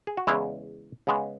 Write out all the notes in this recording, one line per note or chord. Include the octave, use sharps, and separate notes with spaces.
G#4
F#4
E2 C#3 G#3 E4
C#3 G#3 B3